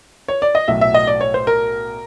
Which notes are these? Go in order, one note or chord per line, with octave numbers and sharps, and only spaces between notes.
C#5
D5
D#5
B1 A2 F#3 E5
E5
D#5
D5
C#5
C5
A#4